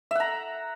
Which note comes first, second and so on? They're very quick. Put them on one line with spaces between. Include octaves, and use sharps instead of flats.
E5 F#5 A#5